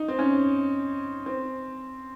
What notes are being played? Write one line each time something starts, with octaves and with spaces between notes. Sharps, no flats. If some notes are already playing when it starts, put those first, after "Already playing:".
Already playing: D#4
C4
C#4
C4